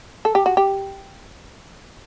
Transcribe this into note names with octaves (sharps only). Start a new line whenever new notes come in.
A4
G4
F#4
G4